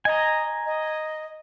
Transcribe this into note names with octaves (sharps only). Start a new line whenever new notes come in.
D#5 G#5 A#5
D#5